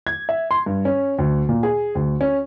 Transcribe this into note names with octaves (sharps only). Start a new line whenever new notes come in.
G#6
E5
C6
G2
C#4
D2
A#2
G#4
D2
C#4